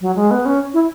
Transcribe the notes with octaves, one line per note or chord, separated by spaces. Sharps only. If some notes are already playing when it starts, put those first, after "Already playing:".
F#3
G#3
B3
C#4
E4